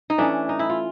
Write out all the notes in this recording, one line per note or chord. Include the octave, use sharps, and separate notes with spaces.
D#4
E3 A3 C#4 D4
D#4
E4
F4